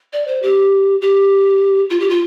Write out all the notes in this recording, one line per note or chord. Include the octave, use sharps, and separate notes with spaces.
D5
C5
G4
G4
F4
G4
F4